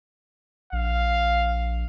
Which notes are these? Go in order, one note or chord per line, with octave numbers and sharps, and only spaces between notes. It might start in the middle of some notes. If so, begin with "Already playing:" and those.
A#1 F5